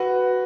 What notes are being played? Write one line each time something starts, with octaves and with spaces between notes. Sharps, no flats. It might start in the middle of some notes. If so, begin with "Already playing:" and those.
Already playing: F#4 B4